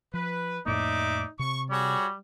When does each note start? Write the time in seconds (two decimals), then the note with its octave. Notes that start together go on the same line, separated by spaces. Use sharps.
0.14 F3 B4
0.66 F2 A2 A#3 D#4 D5 E5 D6
1.39 C3 C#6
1.70 G3 F#4 G#4 C#5